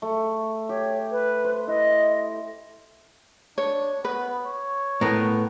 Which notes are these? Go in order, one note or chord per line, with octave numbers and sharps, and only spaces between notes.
A3
G4 C#5
B4
C5
E4 D#5
D4 C#5
B3 B4
C#5
A2 B3 A#4